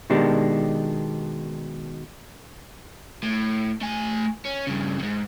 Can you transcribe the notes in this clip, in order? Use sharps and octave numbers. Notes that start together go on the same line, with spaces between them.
B2 D#3 G#3 D4 G4
A2
A3 G#5
C#4
G2 C#3
F2 G#2